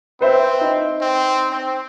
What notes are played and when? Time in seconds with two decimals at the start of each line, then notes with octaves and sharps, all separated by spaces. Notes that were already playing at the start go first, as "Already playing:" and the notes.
0.21 C4 B4 C5 E5
0.61 D#4
1.01 C4
1.52 C4